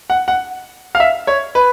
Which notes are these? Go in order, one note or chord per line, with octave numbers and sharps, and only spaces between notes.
F#5
F#5
F5
E5
C#5
B4